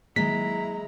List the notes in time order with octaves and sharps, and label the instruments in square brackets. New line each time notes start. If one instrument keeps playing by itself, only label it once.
[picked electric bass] D#3 F#3 A#3 [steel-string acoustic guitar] G#3 [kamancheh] E4 A#5 [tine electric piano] B6